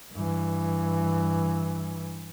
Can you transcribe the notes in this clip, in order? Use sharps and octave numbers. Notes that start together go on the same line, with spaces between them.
G2 E3